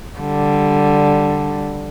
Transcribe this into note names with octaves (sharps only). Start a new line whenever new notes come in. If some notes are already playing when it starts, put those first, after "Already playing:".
D3 G3